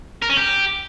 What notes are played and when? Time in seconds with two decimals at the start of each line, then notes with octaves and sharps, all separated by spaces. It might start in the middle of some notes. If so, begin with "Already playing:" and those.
0.22 A#4
0.30 C#4
0.37 G4